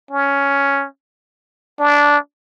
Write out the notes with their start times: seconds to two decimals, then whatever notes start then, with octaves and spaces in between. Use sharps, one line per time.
0.11 C#4
1.79 D4